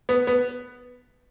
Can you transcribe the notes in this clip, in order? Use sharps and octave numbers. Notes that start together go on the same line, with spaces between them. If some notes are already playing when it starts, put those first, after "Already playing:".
B3
B3